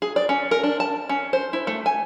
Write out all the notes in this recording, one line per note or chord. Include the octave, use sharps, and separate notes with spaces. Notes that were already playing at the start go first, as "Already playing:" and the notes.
G#4
D5
C#4
A#4
D4
A5
C#4
C5
E4
A3
G#5